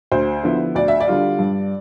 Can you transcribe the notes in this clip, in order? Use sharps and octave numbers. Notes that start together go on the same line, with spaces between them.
D2 C5
D3 F3 B3 E4
D2 D5
E5
D5
D3 G3 D4 F4
G2